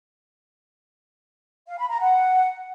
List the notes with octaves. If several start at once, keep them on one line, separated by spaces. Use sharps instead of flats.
F5
B5
A#5
F#5